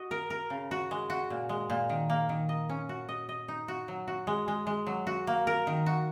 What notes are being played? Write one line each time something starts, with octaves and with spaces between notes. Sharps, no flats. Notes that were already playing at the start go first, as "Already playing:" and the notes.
Already playing: F#4 D#5
A#4
A#4
C#3
F#4
G#3
F#4
A#2
G#3
A#2
D#3
A#3
D#3
D#5
C#4
F#4
D#5
D#5
D#4
F#4
F#3
F#4
G#3
G#3
G#3
F#3
F#4
A#3
A#4
D#3
F#4